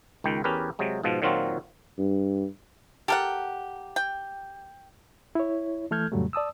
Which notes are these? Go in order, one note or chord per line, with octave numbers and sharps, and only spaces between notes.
C#2 D#3 G5
E2 C#4 G4 A#4 B4
C3 F#3 G#3
G#2 B2 F3
A#2 D#3 F#3 C4 F4 F#4
G2
G4 A4 A#4 F#5
G5
E4 C#5
E3 A3 A4 F6 G6 G#6
F2 A2 C#3 F#3 G3 A3
D5 A5 D#6 E6